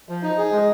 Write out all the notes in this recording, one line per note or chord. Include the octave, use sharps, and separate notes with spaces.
F3
D#4
G#4
G#3